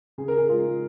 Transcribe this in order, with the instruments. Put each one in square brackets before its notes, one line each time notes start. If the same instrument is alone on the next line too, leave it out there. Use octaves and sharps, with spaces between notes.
[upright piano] C#3 G#4
A#4
G#4
G#3 F4